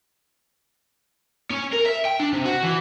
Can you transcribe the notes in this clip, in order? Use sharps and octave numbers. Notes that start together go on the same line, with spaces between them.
C#4
A#4
E5
G5
D4
C3
F#4
E3